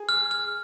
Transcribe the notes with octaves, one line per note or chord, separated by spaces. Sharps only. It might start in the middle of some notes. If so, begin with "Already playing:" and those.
Already playing: G#4
F6
F6